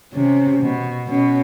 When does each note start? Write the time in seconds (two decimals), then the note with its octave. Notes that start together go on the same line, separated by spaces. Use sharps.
0.14 C3 C#4
0.60 B2
1.07 B2 C#4